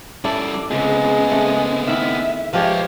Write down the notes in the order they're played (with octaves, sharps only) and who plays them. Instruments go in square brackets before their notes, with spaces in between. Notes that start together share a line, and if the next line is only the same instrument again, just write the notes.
[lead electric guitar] G3 C#4 [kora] E4 A4 [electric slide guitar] D5
[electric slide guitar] C#3 F4 G#4 [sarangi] G#3 [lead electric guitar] B3 C4
[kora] A3
[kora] D#3 E4 [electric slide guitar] E5
[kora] F3 G#3 G4 [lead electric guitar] B4 C#5